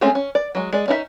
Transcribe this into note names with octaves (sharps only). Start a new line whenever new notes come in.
G#3 A3 C4 C#4 G#4
C#4
D5
F#3 G#3
G#3 D5
C#4 D#4 E4 E5